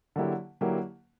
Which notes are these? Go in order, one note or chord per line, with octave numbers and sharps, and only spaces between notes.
D3 F#3 A#3 E4 G4
D3 F#3 A#3 E4 G4